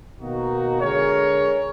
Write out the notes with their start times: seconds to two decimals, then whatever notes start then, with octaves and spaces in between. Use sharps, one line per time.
0.20 B2 D#3 A#3 D#4 F#4
0.81 D3 G#3 G#4 A#4 C#5